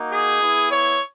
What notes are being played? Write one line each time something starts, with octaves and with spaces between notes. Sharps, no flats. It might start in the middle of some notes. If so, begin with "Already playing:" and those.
Already playing: A#3 D#4 F#4
G#4
B3 E4
C#5